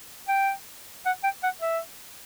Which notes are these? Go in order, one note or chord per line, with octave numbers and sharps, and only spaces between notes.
G5
F#5
G5
F#5
E5